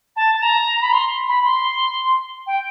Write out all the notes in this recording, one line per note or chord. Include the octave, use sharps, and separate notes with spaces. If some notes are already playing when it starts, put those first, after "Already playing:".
A5
A5
A#5
B5
C6
B5
C6
G5